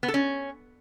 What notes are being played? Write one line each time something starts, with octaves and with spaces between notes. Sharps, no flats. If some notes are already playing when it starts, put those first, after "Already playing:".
B3
A4
C#4